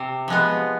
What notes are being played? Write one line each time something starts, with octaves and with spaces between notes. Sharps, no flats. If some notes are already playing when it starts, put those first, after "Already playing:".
Already playing: C3
F3 G#3 B3